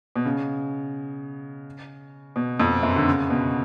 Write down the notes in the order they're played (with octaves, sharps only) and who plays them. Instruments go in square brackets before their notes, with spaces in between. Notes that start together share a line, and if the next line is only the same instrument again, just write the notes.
[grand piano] B2
C#3
B2
F2
F#2
D3
C#3
B2